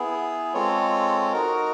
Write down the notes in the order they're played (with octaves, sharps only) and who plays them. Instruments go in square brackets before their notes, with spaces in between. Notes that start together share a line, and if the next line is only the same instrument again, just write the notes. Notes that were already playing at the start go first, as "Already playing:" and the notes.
Already playing: [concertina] B3 E4 G#4
G#3 C4 F4 A4 C#5
D#4 F#4 A#4